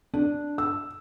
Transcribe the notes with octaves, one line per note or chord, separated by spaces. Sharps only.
D4
E6